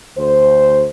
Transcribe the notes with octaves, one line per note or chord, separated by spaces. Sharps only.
D2 C5